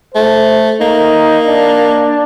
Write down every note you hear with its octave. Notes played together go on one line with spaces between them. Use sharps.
A3 C5
A#3 D#4
D4